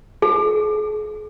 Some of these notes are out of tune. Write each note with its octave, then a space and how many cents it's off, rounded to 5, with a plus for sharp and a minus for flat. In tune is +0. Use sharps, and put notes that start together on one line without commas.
G#4 +40